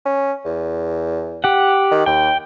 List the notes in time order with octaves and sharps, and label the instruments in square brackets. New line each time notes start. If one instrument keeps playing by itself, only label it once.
[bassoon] C#4
E2
[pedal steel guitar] G4 F#5
[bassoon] D#3
[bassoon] D#2 [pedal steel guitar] G5